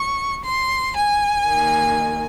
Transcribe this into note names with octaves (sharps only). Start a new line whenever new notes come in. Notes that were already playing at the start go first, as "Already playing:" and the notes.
Already playing: C#6
C6
G#5
D#2 D#3